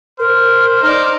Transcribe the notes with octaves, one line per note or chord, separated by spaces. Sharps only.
A#4 C5 F6
D#4 D5